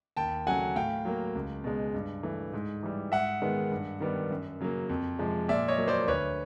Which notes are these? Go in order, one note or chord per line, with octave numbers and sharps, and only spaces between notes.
D#2 G5 A5
C#3 F#3 A3 F#5 G#5
A2 F5 G5
F#3 A#3
C#2
B2 G#3
G2
E3 A3
G#2
E3 G3
G#2 E5 F#5
D#3 G#3 B3
G2
D#3 G3 B3
F#2
C#3 F#3 A#3
F2
C3 F3 G#3
A#2 D5 E5
C#5 D#5
F#3 A#3
C5 D5
D2 B4 C#5